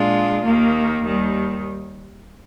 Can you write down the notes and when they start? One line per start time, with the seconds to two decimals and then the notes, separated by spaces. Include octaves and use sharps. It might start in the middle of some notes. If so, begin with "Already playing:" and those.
Already playing: A#2 G#3 D4 F4
0.44 D#2 D#3 A#3
1.04 D#2 D#3 G3